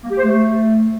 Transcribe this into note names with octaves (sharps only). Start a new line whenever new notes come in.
A#3
G4
C5
A3